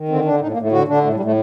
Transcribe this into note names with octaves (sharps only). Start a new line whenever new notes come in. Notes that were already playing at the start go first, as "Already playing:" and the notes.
Already playing: D#3
D3 C4
D3 D4
A2 D#4
A#3
A2 A3
D3 F#4
D3 D4
A2 A3
G3
A2
A3